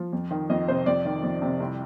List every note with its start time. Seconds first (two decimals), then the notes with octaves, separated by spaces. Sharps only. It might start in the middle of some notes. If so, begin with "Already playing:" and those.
Already playing: F3
0.13 F2
0.31 D#3
0.50 F2 D#5
0.68 C3 C5
0.86 F2 D5
1.05 D#3
1.23 F2
1.42 C3
1.60 C2